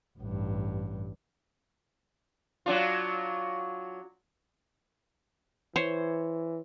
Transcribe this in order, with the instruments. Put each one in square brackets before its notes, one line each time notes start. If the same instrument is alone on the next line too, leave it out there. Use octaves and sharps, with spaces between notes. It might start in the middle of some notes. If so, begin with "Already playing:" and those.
[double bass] A1 G2
[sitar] F#3 D4 F4
[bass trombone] E3 [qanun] C5 C#5